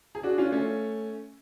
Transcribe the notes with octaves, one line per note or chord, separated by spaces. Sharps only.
G#4
D4 F#4
C#4 F4
A3 C#4